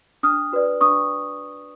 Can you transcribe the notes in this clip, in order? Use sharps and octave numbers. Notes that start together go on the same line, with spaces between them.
D4 D#6 F6
F#4 B4 D5
D4 C#6 D#6